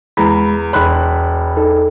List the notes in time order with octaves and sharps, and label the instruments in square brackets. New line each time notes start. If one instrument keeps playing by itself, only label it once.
[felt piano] E2 [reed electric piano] G#3 A#5 B5
[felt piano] E1 B5 [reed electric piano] C#5 C6 F#6
[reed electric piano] D#4 A4